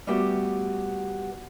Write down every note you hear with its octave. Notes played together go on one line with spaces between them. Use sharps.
G3 A3 B3 F#4 G4